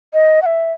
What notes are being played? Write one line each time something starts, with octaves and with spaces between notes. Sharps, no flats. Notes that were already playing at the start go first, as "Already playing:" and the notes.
D#5
F#5
E5